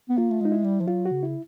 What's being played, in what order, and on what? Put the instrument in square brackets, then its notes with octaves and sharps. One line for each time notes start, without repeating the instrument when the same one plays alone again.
[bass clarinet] B3
[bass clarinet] A#3 [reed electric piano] F4
[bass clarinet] A3
[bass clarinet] G#3 [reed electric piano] D#4
[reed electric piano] E4
[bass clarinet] G3
F3
[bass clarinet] F#3 [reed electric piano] F4
[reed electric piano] F#4
[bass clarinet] C#3
[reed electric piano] E4